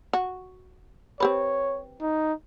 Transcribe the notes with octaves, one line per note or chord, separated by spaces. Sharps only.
F#4
C4 G4 B4 C#5
D#4